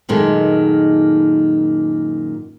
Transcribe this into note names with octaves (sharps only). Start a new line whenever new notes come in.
F#2 A#2 D#3 G#3 A3